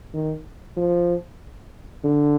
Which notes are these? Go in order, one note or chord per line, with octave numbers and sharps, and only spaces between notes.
D#3
F3
D3